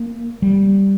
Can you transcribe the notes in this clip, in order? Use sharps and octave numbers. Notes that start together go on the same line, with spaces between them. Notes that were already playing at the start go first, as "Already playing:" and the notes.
Already playing: A#3
G3